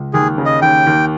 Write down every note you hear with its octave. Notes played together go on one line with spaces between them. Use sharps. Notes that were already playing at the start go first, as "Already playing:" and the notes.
Already playing: C#2
D#2 G#4
C#3
D#5
D#2 G5
D#2